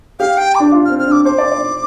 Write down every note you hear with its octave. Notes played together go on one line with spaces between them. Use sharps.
G4 F5
G5
D6
D4
F4
C4 F6
F6
D4 D6
C5 D6
D5
D5